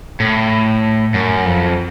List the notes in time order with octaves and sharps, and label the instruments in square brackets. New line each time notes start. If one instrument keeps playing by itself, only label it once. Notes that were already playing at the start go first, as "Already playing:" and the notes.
[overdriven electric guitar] A2
F#2
F2